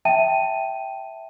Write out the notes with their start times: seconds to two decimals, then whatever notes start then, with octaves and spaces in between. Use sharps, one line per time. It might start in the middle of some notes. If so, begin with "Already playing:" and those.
0.05 E5 G5 A5 D#7